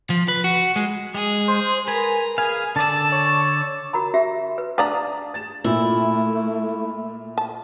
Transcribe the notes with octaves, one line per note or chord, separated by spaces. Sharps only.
F3
B4
F#4
G#3
G#3 G#4
C5
A#4 B4 G#5
G#4 B4 F5 G#5
D3 D5 A5 E6 A6
C#5
F#4 A#4 A#5 B5
F#4 G4 E5
B4
D4 D5 F5 A5 A#5 D#6
A6 E7
A#2 A3 E4
A5